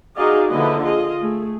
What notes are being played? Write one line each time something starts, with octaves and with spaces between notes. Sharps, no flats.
D#4 F#4 G#4 D5 D#5 F5
D3 F3 A#3 E4 B4 D#5
F4 G#4 D#5
A3 G#4